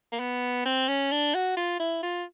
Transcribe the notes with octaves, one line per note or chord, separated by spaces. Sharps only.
A#3
B3
C4
C#4
D4
F#4
F4
E4
F4